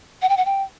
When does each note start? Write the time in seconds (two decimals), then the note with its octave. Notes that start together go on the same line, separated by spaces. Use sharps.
0.22 F#5
0.29 G5
0.37 F#5
0.46 G5